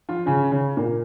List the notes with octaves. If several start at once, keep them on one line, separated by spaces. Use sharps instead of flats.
F3 F4
C#3 C#4
C#3 C#4
A#2 A#3